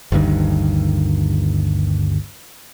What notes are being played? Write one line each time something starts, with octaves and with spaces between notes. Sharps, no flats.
G1 D2 G2 D#3